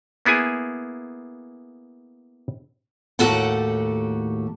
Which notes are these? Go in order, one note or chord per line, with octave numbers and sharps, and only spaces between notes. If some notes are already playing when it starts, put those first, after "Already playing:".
A#3 B3 E4 G#4 G#5
D#2 A2 F#4 G4 A4 F#5